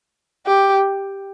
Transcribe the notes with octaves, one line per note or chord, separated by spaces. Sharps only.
G4